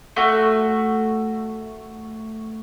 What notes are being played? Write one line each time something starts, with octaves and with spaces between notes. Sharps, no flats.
A3 F#4